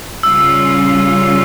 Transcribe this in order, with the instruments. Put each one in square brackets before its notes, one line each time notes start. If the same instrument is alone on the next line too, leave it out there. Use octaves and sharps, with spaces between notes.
[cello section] C#3 G3 C#4 F4 [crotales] E6